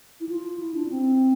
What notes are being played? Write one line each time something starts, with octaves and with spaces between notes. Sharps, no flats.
E4
F4
E4
D4
C#4
C4